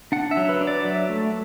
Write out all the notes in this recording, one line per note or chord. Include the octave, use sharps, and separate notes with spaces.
D4 F#5
E5
F#3
B4
D4
D5
F#3 E5
A3